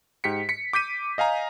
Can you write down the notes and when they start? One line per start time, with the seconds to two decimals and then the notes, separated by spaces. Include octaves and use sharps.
0.24 G#2 G4 B6 C#7
0.49 B6 C#7
0.73 D6 G6 B6 D#7
1.18 D#5 F5 G#5 A#5